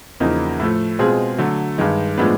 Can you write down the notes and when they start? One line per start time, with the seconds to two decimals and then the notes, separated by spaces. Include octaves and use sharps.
0.20 E2 C#3 F3 A#3 D#4
0.60 A2 F3 A3
0.99 B2 G#3 C4 F4 G#4
1.38 D3 F#3 A3
1.78 G2 D#3 G#3
2.17 A2 F3 G#3 B3 D4